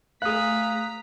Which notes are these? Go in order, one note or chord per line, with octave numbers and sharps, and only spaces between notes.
A3 G#4 F5 A#5 D#6 F#6 B6